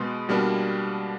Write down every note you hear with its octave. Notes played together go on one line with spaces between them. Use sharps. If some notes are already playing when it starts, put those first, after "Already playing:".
Already playing: B2 G#3 B3 C6
B2 G3 A#3 D4